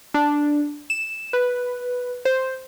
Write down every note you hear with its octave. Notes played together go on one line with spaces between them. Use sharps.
D4
E7
B4
C5